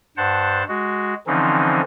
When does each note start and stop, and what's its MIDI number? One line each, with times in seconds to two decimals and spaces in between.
0.17 0.64 43
0.17 0.64 72
0.17 0.64 78
0.17 0.64 81
0.68 1.14 56
0.68 1.14 66
1.27 1.81 50
1.27 1.81 52
1.27 1.81 53
1.27 1.81 60
1.27 1.81 61
1.27 1.81 63